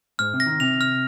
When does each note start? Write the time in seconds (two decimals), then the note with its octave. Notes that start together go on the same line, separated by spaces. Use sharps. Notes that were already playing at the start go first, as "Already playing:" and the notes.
0.19 G#2 F6
0.34 C3
0.40 A#6
0.46 D#3
0.60 C3 F7
0.81 F6